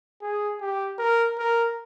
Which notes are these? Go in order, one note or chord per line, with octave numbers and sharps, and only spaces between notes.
G#4
G4
A#4
A#4